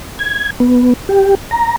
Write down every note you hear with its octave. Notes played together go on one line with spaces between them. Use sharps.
G#6
B3
G4
A#5